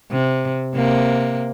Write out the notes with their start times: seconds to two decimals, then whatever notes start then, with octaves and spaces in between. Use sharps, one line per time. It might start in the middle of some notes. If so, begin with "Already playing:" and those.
0.12 C3
0.74 C3 A#3